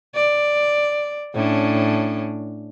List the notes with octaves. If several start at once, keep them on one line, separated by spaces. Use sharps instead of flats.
D5
A2 C#4 D4